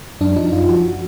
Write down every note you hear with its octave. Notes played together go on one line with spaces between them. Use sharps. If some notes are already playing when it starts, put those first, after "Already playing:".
F#2 D4
F3 D#4
F#2 F4
F3 F#4